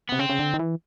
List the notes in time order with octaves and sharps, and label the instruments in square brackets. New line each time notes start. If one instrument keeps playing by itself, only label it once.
[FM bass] C3 [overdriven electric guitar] B3
[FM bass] C#3 [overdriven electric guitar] C4
[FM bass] C#3
D3
D#3
E3